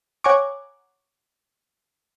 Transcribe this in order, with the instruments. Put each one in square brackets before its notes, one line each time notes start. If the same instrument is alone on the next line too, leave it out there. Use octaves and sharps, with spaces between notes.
[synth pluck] C#5 F#5 G#5 A#5 C#6 D6